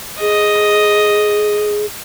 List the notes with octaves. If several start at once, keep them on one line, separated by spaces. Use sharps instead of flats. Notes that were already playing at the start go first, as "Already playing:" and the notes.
G#4 D#5